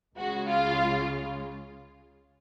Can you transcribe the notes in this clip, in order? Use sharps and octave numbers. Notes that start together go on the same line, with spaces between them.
C#2 C#3 G#3 F#4
F4